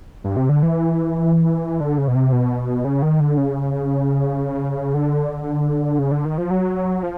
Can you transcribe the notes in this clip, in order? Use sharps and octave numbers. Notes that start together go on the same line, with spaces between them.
G2
C3
D3
E3
D3
C#3
B2
C3
B2
C#3
D#3
D3
C#3
D3
C#3
D3
D#3
F3
F#3
F3